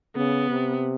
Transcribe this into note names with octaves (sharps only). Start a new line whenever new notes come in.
C#3 B3
C3